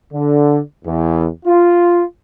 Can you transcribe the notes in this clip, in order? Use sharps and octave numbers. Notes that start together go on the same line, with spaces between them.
D3
E2
F4